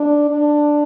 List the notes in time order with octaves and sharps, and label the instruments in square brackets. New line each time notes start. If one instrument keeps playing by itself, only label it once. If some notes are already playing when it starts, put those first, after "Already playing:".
Already playing: [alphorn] D4
D4